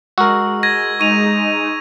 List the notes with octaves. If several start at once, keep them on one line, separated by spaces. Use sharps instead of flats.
G#3 F#4 A#4 E6
G#6 A#6 D#7
G#3 D#4 C#6 D#7 F7